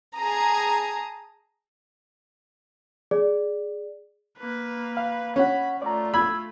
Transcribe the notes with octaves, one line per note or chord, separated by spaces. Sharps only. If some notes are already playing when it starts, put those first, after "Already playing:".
G#4 A5 A#5 D#6
G#4 D5
A#3 B4
F5
C#4 C#5 F#5 B5
A3 F4 D5 A#5
B5 E6 G#6